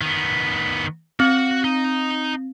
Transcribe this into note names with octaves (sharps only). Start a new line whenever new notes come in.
D#3 B3
C4 F#4 F#5
D#4